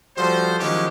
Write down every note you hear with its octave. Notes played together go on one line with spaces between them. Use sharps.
F3 G3 F#4 A4 C5
D#3 F3 F#3 G#3 C#4 G4